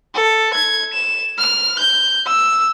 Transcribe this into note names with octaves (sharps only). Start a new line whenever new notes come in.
A4
G#6
E7
F6
G6
E6